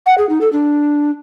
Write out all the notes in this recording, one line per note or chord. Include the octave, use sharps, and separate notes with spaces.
F#5
G#4
D#4
A4
D4